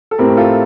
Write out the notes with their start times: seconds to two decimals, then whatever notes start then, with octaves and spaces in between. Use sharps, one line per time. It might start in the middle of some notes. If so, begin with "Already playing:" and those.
0.11 A4
0.18 A2 A3 C4 G4 A#4
0.37 F4 A4